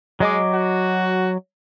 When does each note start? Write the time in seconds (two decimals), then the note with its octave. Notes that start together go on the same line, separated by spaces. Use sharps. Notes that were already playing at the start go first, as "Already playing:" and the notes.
0.20 F#3 G#3 D#5 D6
0.53 F#4